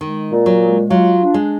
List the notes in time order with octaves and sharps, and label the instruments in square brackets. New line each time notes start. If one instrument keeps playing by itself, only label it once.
[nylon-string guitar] D#3 [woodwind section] G#3
[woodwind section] A#2
[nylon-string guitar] F#3
[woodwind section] G#3
[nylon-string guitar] F#3 [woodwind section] F4
[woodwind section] D4
[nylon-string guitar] G#3